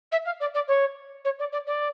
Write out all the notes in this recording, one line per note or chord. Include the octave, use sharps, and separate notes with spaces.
E5
F5
D5
D5
C#5
C#5
D5
D5
D5